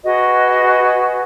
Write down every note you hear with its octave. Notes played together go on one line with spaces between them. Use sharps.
F#4 G#4 B4 D#5